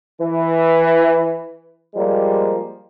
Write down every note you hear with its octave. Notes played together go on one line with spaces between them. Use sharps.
E3
F3 G3 G#3 A#3